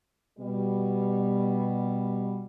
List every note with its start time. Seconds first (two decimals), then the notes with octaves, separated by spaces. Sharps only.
0.38 B2 G3